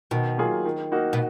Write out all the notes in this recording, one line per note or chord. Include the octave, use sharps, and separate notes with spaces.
B2 D#3
F#3 A#3 F4 G#4
D#3
A#3 D#4 F#4
B2